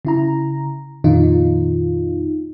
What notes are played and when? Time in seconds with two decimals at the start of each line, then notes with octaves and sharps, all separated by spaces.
0.05 C#3 E4 A#5
1.04 F2 A#2 D#3 D#4 F4